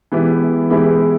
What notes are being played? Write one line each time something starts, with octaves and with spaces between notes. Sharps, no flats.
E3 G#3 B3 E4 G4
E3 G#3 B3 E4 G4